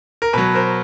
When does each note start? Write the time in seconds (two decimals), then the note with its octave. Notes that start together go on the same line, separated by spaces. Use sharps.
0.22 A#4
0.33 B2 F#3 B4
0.54 A#4 C5